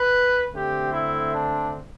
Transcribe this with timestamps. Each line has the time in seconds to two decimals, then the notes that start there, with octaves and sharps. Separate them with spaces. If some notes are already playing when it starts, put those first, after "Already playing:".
Already playing: B4
0.53 D3 A3 C4 G4
0.92 E4
1.33 D4